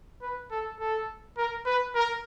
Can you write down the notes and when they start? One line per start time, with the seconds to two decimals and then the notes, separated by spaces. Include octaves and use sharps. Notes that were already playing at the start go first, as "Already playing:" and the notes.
0.22 B4
0.51 A4
0.80 A4
1.37 A#4
1.66 B4
1.95 A#4